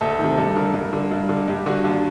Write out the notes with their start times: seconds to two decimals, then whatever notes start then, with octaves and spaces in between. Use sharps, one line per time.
0.01 D2 A4
0.19 C3 D#3
0.37 G2 A4
0.56 D3 A#4
0.74 G2
0.93 D3
1.11 G2
1.29 D3
1.48 G2 G4
1.66 D3 F#4
1.84 D#2 D4